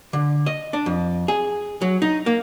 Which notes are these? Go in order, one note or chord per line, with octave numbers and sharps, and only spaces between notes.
D3
D#5
D4
F2
G#4
F#3
D#4
A#3